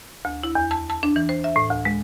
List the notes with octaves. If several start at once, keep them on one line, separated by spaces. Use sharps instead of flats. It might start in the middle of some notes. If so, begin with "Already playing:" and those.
D2
E4
E2
A5
A5
D4
E3
C5
E5
A2
D2
G#3